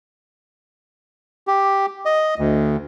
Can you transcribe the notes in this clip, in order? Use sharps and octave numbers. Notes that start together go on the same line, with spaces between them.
G4
D#5
D2